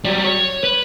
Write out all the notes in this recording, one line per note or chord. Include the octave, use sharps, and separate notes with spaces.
F#3 G3
C#5
B4